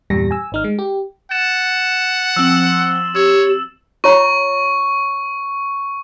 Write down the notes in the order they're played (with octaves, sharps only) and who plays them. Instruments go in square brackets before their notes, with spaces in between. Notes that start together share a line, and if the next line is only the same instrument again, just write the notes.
[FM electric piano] E2 G2 A#2 G3 A#6
G#5 E6
G#1 D#4 F6
G#3
G4
[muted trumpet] F#5 [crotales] A6 E7
[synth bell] F3 C4 [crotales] E6 F#7
[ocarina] G4 [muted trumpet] C#5 [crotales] E6 [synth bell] E7
[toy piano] F4 C#5 A#5 [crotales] C#6